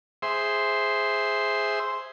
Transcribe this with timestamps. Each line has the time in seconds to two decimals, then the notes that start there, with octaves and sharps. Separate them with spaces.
0.22 G#4 C5 E5 C6